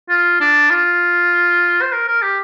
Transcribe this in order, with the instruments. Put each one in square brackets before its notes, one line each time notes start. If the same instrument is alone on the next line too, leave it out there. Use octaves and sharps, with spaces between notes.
[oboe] F4
D4
F4
C5
A#4
A#4
G4